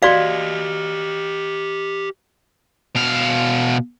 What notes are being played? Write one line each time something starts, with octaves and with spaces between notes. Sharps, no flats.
F#4 G4 D5 D#5 F5
B2 F5